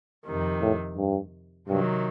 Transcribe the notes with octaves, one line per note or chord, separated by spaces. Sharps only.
F2 C3 D#3
A2
G2
G2 C3 D#3 F#3